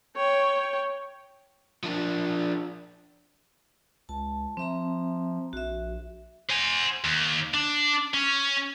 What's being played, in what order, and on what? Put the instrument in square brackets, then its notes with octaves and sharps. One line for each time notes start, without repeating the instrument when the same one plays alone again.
[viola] C#5 G5
[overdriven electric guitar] F3 D4
[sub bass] C#2 [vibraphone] A5
[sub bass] F3 [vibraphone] C4 E5 A#5
[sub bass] A#1 [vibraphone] F#4 E5
[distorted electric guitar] C5 G#5
D#2
D4
C#4